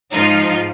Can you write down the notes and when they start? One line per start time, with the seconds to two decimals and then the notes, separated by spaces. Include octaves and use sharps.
0.13 G#2 F3 D#4 F4